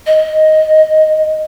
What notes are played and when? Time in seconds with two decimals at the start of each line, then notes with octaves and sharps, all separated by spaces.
0.07 D#5